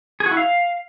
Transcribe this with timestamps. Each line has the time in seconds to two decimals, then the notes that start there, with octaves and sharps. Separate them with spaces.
0.20 G#4
0.26 F#4
0.31 E4
0.37 F5